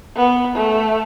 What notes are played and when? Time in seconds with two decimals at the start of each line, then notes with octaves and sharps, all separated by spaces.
0.16 B3
0.56 A3